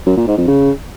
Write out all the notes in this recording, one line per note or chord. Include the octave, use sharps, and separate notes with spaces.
F#2
A#2
G#2
F2
C#3